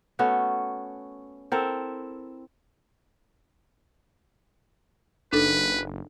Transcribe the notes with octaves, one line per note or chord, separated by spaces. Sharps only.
A3 B3 C#4 F#4
C4 E4 A4 A#4
F#1 D4 D#4 A4 B4